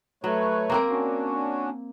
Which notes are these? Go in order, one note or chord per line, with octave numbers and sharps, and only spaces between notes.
F#3 A3 B4 C#5
A#3 C4 A#4
C#4 D4 F#4